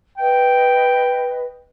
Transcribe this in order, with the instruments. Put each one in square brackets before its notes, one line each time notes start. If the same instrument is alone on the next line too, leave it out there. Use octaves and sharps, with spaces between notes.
[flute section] B4 D#5 [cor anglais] G5